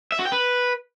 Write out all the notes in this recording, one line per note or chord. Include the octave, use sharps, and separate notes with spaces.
E5
F#4
G5
B4